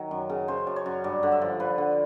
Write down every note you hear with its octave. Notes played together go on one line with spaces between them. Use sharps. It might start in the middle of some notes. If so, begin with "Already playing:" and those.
Already playing: D#3 F#3
F#2
C#3
C#3 C5
F#2
C#5
F#2
G2 D5
D3
E5
F3
F3 B4
D3